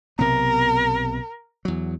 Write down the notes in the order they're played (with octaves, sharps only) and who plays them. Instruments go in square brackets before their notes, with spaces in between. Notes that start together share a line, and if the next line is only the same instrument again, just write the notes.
[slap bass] B1 C3 B3 [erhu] A#4
[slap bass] E2 F#3